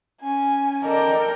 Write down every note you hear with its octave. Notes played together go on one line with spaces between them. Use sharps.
C#4 G#5
A4 A#4 D5 D#5 G5